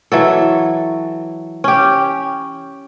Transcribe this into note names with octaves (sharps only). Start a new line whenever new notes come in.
E3 F#3 A4
C#4 G4